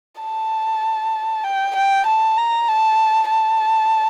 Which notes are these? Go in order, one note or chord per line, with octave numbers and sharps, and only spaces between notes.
A5
G5
G5
A5
A#5
A5
A5